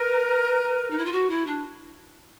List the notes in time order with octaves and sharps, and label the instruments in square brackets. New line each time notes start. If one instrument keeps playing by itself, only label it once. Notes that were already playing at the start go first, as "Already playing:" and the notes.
Already playing: [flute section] A#4 [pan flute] B4
[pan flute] D#4
E4
F4
F#4
E4
D4